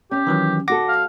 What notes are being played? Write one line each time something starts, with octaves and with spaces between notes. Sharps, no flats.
C#4 G4
D#3 E3 F#3
D2 F#4 A4 F#5 D6 A#6
F5